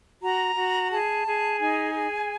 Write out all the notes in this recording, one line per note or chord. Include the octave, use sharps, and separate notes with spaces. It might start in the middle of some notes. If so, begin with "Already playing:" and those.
F#4 A#5
F#4
G#4 A5
G#4
D#4 G#5
G#4